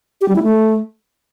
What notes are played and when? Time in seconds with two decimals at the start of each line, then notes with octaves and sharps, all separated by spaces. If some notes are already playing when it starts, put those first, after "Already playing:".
0.21 G4
0.28 G3
0.36 E4
0.43 A3